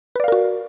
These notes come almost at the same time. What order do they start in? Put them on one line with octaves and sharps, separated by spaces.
B4 D5 F5 A#4 F#4